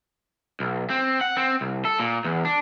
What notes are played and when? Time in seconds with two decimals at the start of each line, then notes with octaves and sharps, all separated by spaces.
0.60 B1
0.90 C4
1.21 F#5
1.37 C4
1.61 C2
1.85 A4
2.00 A#2
2.25 E2
2.45 D4